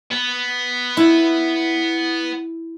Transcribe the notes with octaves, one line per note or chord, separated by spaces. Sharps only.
B3
E4